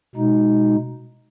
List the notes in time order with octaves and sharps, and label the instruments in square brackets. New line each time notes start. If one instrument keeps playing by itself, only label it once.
[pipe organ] B2 G#3 D#4